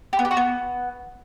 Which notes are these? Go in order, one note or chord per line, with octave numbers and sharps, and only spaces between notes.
G4
B3
G4
F#4
B3